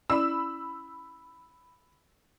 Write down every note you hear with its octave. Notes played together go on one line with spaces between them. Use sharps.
C#4 E4 D5 B5 E6